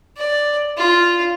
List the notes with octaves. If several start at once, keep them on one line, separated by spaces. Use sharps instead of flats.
D5
F4